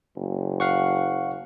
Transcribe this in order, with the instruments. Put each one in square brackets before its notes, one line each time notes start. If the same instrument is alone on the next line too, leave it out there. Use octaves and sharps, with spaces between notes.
[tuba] F#1
[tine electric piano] F5 F#5 C#6